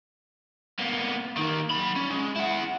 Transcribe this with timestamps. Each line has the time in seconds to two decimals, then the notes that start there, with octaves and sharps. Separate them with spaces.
0.79 A#3 B3
1.37 D#3 A#3
1.70 F#3 B5
1.96 C#4
2.10 G#3
2.36 E4 F#5